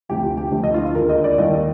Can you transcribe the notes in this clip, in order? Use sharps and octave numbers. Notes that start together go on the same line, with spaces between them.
D2 C3 F3 G4
F4
G4
D2 D3 F3
D#5
F4
F4
D#2 D3 G#3 A#4
D#5
D5
D#2 D#3 G3 D#5